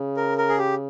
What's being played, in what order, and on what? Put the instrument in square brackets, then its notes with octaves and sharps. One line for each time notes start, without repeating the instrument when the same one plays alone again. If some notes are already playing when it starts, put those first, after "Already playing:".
Already playing: [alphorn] C#3
[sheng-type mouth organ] A#4
A#4
G#4
G4